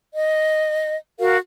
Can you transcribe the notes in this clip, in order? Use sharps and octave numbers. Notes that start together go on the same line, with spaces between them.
D#5
F#4 A#4 F5